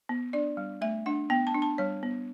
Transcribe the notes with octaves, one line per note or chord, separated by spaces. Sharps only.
B3
D4 D5
G3
A3 E5
D4 F#5
B3 G5
A5
D4
A5
G3 C#5
B3